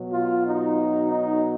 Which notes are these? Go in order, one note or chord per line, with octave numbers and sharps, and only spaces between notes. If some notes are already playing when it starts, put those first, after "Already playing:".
Already playing: B2 F#3
F4
D#4
D#4